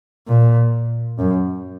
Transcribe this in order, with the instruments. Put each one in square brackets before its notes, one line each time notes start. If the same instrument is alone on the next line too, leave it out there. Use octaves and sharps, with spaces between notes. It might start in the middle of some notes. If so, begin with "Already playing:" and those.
[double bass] A#2
F#2